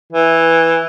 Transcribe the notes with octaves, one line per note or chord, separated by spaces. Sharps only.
E3